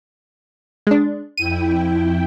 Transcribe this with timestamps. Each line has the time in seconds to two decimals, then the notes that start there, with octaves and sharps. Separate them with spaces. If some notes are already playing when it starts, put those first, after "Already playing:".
0.87 G#3 D4
1.37 F2 E4 G5 D#7